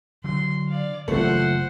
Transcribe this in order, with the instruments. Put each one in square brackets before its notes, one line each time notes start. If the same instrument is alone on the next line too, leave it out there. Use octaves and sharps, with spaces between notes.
[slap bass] D3 F#3 [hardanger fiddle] C6
[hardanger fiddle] D5 F5
[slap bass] F#1 E3 [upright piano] F3 A3 [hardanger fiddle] C5 F#5